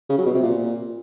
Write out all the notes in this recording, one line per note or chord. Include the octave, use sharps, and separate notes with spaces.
C#3
F#3
B2
C3
A#2